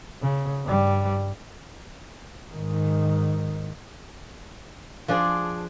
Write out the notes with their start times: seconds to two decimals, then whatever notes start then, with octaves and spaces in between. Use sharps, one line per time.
0.21 C#3
0.63 G2 G3
2.53 G#2 D#3
5.08 F3 D4 G#4 D5